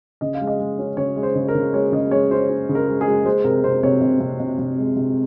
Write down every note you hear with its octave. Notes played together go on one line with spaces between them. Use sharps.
C#3 D#5
F5
G#3
D#5
G#3
C#4
C#3 C#5
G#3
C5
C#3
A#4
C#3
G#3 C#5
C#3 D#5
G#3 C#5
C#4 C5
C#4
C#3
A#4
G#3
G#4
G#3
G#3 C5
C3 A#4
C3 C5
C3 C#5
C3
C3
C3
C3
G#3
C3